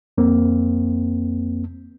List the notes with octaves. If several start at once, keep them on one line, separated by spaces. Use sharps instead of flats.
F2 A#3 C4